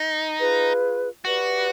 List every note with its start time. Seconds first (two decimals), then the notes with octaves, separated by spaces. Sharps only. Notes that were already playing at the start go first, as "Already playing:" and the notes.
Already playing: D#4
0.38 F4 G#4 B4
1.25 E4 F#4 G4 B4 D5